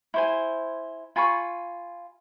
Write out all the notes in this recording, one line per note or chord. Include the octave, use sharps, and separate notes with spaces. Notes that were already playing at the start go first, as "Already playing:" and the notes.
E4 C5 G#5
F4 G#5 B5 C#6